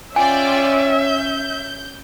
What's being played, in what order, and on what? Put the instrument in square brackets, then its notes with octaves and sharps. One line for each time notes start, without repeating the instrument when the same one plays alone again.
[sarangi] C#4 [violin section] F4 D5 G5 [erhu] E5 [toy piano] G#5
[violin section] G6